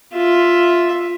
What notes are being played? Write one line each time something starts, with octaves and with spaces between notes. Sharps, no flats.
F4 E5